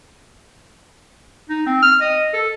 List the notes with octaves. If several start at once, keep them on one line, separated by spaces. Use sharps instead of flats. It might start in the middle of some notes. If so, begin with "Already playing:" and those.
D#4
C4
F6
D#5
A4